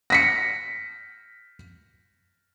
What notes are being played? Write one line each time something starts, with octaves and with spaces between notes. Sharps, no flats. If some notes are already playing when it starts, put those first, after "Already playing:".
A#6 B6 C#7